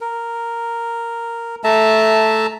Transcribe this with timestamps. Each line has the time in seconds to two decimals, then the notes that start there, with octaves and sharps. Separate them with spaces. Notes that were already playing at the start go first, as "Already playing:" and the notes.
0.01 A#4
1.64 A3 E5 A5 A#5